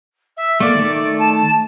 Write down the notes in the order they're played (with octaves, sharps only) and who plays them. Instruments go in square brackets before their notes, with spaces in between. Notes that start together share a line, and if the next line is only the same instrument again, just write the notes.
[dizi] E5
[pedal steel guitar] A3 A#3 [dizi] D5
[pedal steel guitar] D#3 A3
[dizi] A5